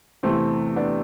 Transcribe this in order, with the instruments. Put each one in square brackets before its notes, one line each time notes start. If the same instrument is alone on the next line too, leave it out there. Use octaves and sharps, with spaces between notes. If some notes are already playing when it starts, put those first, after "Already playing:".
[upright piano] E2 C3 E3 A3 C4
B3 D4